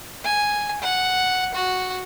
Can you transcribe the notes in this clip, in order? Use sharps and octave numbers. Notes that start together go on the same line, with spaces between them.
G#5
F#5
F#4